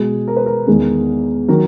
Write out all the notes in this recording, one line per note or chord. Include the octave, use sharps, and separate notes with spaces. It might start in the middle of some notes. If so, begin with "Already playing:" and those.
Already playing: B2 G#3 G#4
A#4
B4
A#4
E2 D#3 G#3 G#4
D#3 F#3 A#4